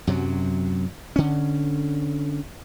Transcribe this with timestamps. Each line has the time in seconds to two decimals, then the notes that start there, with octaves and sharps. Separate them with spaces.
0.07 F#2 C3 F#3
1.16 D3 C#4